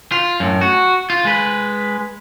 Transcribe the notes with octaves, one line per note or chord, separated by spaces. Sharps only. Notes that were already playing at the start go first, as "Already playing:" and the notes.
F4
F#2 A2
F#4
F4
G#3 B4